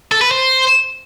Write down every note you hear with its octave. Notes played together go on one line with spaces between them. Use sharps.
A4
B4
C5